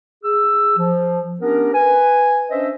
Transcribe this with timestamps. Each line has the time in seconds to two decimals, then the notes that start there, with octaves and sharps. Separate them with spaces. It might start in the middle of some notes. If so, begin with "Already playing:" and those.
0.24 G#4 E6
0.77 F3
1.40 B3 C#4 D4 G4 A#4
1.73 B4 G#5
2.50 C#4 D4 C5 D#5 E5